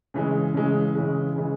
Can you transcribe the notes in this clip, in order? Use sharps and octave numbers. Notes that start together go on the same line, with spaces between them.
C#3 E3 G#3
C#3 E3 G#3
C#3 E3 G#3
C#3 E3 G#3